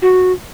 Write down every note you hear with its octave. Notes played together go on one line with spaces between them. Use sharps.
F#4